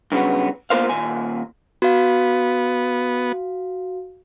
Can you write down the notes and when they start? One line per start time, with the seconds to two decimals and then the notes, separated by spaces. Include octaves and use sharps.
0.12 G2 C#3 F#3 B3
0.70 A#3 B3 F4 A#4 C5 F5
0.89 D#2 A#2 G#5
1.82 B3 F#4 F5